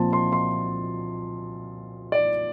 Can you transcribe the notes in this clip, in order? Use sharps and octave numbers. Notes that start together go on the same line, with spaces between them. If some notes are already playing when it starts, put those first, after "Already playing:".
Already playing: A#2 F3 C4 A5 C6
C6
C6
D5